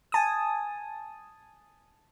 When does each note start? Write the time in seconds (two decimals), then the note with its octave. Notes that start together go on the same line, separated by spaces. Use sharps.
0.12 G#5 A5 D#6